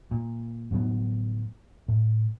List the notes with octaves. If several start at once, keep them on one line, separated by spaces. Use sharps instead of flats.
A#2
G1 A2 F#3 B3
A2